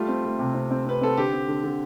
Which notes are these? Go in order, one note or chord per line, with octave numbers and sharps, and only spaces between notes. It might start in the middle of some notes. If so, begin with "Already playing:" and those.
Already playing: G3 A3 F4
C4
A3
C3
C4
C4
C4 B4
C4 A4
D3 G4
C4
D3
D3